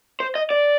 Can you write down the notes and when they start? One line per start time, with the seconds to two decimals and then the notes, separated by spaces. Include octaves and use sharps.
0.20 C5
0.35 D#5
0.51 D5